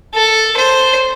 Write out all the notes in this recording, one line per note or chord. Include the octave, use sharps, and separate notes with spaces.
A4
C5